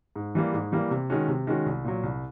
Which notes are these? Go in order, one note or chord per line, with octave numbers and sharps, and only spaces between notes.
G#2
E3 G3 A#3
G#2
E3 G3 A#3
C3
D#3 G#3 C#4 F#4
C3
D#3 G#3 C#4 F#4
C2
A#2 F#3
C2